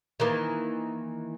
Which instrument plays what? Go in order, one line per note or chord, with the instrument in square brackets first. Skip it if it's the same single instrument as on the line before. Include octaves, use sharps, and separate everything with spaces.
[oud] D#3 E3 A#3